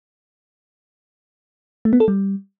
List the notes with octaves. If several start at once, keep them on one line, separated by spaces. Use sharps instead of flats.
A3
B3
A4
G3